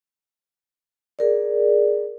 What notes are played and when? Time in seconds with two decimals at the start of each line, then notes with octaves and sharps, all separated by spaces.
1.19 G#4 A#4 D5